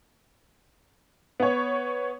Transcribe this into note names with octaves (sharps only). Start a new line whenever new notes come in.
B3 C#5